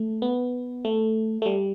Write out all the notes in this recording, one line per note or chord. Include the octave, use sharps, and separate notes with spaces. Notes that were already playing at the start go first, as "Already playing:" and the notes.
Already playing: A3
B3
A3
A3
G3